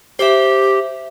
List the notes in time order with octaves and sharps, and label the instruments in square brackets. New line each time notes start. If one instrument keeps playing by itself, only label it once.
[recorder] G4 [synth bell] C5 E5